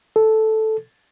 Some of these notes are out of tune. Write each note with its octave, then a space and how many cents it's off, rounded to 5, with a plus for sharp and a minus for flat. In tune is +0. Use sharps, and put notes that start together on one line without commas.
A4 -5